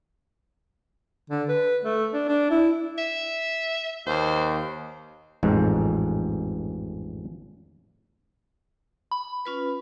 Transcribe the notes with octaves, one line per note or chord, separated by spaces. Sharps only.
D3
B4
A3
D4
D4
E4
E5
D#2 C5
A1 F2 G#2
B5
C#4 F4 B4